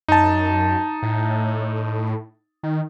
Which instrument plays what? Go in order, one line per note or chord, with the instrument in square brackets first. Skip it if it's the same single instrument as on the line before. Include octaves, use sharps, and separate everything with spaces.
[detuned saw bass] F#2 [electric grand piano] D#4 A5
[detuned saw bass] A2
D#3